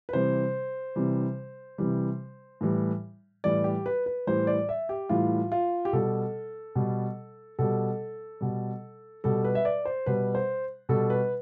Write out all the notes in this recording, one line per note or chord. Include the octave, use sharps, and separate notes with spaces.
B4
C3 E3 G3 C5
C3 E3 G3
C3 E3 G3
A2 E3 G3
A2 E3 G3 D5
G4
B4
B4
A2 E3 G3 C5
D5
E5
G4
A2 E3 G3 F4
F4
G4
B2 G3 A4
B2 G3
B2 G3 A4
B2 G3
B2 G3 A4
B4
E5
D5
C5
B2 G3 B4
C5
B2 G3 A4
B4